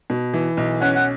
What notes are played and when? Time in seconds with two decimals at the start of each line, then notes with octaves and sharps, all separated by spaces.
0.10 B2
0.34 E3
0.57 B1
0.82 C#4 F#5
0.96 F#5